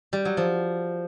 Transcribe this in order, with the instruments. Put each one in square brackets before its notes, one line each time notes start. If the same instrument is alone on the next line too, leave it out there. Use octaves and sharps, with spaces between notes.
[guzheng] G3
F#3
F3